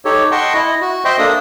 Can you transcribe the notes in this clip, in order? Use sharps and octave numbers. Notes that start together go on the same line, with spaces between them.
D#4 G4 A4 C#5
D#5 F#5 G5 A5 C6 C#6
E4 D#5
F#4
C5 D#5 E5 G5 C6
A#3 D4 A4 D#6